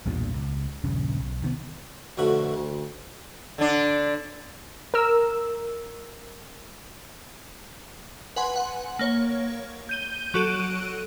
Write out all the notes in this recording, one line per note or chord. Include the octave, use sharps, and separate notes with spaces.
B1 E2 G2 A#2
C#2
D#1 A#1 G2 C#3
B1
C3 D#3 A#3 B3
F2 B2 D3 A3 F#4 B5
D2
D3 D4
A#4 E6
B4 F#5 G#5 C6
F#5
A#3 C#5
G6 D#7 G7
F#3 F#4 A4 F#6 D7 D#7